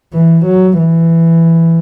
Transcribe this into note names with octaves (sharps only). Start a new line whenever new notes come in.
E3
F#3
E3